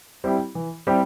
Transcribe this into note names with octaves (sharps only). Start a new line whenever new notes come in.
G3 C4 E4 G4
E3
G3 C4 E4 G4